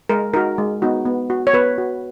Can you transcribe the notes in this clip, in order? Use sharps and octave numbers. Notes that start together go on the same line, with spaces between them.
G#3 A#4
D#4 F#4 A#4
G#3
B3 D#4 F#4
B3
F#4
C#5
B3 B4
F#4